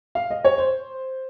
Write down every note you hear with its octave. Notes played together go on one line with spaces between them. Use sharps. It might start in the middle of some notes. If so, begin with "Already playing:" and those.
F5
D#5
C#5
C5